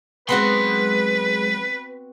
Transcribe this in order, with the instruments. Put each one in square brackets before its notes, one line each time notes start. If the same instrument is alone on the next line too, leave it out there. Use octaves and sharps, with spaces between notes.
[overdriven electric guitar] F#3 C6 [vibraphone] G#3 G#4 [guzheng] B3 C4 F#4 [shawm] B4